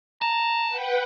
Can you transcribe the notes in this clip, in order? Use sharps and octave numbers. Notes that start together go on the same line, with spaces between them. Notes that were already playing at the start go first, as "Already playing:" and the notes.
A5 A#5
B4 F#5 G5